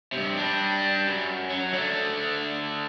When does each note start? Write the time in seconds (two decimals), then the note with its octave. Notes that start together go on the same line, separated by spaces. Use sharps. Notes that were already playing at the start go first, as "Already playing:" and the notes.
0.12 G2 C3
0.37 G3 D4
1.07 F#2
1.50 F#3
1.74 D3 A3